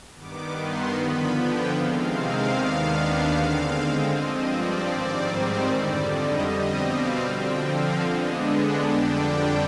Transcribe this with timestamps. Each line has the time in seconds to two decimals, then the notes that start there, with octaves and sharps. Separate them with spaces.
0.15 G2 D#3 B3 D6
0.55 C6
0.94 D3 F3 B3 B5
1.35 G5
1.73 C3 D#3 G#3 C4 F5
2.12 F5
2.51 D#2 D#3 B3 D4
3.31 D3 G#3 C4
4.09 G2 F3 C4 D#5
4.49 D5
4.88 G#2 D#3 G3 C4 D5
5.28 C5
5.67 F2 D3 G3 D5
6.06 D#5
6.46 B2 G3 C4 D#5
6.85 F5
7.24 D3 F3 C4 G5
7.65 F5
8.03 D3 G#3 B3 D4 D#5
8.82 F2 D3 G3 D4 G5
9.22 G5